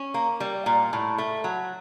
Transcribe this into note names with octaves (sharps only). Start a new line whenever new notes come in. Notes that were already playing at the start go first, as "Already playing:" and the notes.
Already playing: C#4
A#3
G3
A#2
A2
A3
F#3